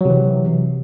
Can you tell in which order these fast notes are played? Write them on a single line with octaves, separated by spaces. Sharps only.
F#3 C3 E3